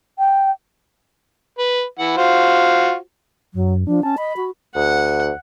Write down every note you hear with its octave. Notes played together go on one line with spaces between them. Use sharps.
G5
B4
E3 F#5
F4 F#4 C5
F#2 F#3
F3 D4
C#4 A5
D#5 B5
F#4
D2 F#5